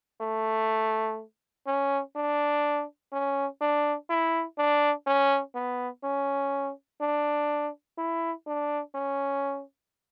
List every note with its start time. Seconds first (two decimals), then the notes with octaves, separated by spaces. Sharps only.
0.21 A3
1.67 C#4
2.16 D4
3.13 C#4
3.61 D4
4.10 E4
4.58 D4
5.07 C#4
5.55 B3
6.04 C#4
7.01 D4
7.98 E4
8.47 D4
8.95 C#4